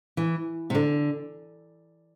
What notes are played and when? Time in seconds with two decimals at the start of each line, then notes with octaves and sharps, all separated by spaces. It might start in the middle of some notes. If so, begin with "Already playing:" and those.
0.17 E3
0.70 C3
0.75 D3